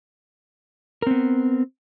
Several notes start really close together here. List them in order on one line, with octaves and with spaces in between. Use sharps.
A#4 C4 B3